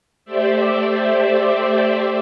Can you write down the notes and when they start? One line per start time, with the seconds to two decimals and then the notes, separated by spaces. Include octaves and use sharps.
0.25 A3 G4 C5 D5 E5